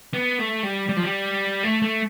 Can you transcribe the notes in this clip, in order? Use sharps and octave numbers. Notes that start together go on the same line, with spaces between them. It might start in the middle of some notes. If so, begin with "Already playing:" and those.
B3
A3
G3
G3
F3
G3
A3
A3